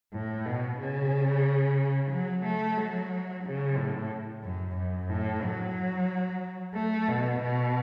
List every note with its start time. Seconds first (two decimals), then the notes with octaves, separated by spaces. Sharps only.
0.13 A2
0.46 B2
0.79 C#3
2.11 F#3
2.45 A3
2.78 F#3
3.44 C#3
3.77 A2
4.43 F#2
4.76 F#2
5.09 A2
5.42 F#3
6.74 A3
7.08 B2
7.40 B2